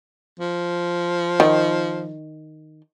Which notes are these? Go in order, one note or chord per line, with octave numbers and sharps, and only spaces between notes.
F3
D#3